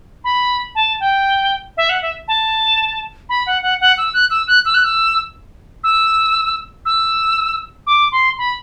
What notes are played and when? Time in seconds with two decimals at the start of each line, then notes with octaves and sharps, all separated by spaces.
0.24 B5
0.75 A5
1.00 G5
1.77 E5
1.89 F#5
2.02 E5
2.28 A5
3.29 B5
3.46 F#5
3.63 F#5
3.80 F#5
3.98 E6
4.14 F#6
4.30 E6
4.48 F#6
4.65 E6
4.74 F#6
4.84 E6
5.84 E6
6.85 E6
7.87 D6
8.12 C6
8.38 B5